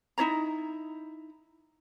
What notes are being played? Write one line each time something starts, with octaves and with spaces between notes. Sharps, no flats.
D#4 E4 C#5 A#5